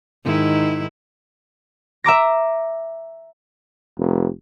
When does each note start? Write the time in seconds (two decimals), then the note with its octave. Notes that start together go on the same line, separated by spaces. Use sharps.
0.24 G#2 D#3 E4
2.04 E5 A#5 D6 A#6
3.98 F1